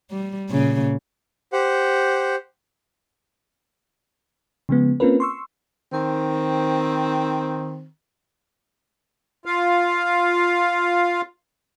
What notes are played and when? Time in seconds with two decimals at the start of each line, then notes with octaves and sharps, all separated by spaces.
0.11 G3
0.50 A#2 C#3
1.53 G4 C5 F#5
4.69 C#3 F3 G#3 B3
5.00 A#3 C4 C#4 F4 A#4 B4
5.20 C6 C#6 E6
5.93 D#3 C4
9.45 F4 F5